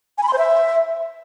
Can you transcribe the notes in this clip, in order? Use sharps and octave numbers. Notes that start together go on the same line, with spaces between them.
G#5
B5
C6
C5
E5